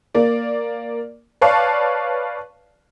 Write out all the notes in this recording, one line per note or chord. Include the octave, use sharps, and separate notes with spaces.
A#3 D5
B4 C#5 D5 F5 A5 C#6